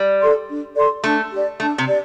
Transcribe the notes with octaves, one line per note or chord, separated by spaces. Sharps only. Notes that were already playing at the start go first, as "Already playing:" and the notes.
Already playing: G3
A4 D5 C6
D4
A4 D5 C6
A3 D4
G4 D5
A3 D4
C3
G4 D5